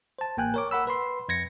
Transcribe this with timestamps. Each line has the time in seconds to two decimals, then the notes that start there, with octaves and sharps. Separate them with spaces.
0.19 C5 A5
0.37 A1 A#3 G5 G#5 F#6
0.54 A#4 C#5 D6
0.71 A#4 F#5 B5 E6
0.87 B4 B5 C6
1.29 F2 G#6 A#6 C#7